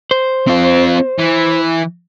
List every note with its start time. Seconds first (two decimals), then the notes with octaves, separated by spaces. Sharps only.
0.11 C5
0.47 C4 F4
1.18 E3